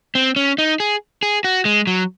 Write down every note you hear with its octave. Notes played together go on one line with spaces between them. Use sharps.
C4
C#4
D#4
G#4
G#4
F#4
G#3
F#3